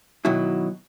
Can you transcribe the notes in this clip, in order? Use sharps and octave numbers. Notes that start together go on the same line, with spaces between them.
B2 D#3 F#3 E4